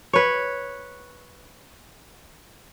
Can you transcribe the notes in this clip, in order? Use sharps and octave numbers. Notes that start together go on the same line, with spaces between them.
B4 C#5